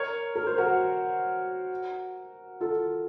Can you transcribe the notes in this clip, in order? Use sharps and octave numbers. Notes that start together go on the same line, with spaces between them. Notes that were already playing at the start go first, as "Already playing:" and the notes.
Already playing: A#4 C#5
A#4
C5
F#4 A#4
F4 A4